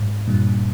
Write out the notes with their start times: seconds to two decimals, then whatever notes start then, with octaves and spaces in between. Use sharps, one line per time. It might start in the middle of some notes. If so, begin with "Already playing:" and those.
Already playing: G#2
0.28 G2 A#2